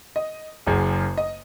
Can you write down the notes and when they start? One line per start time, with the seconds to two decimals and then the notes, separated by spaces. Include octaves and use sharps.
0.16 D#5
0.67 F#1 F#2 C#3
1.17 D#5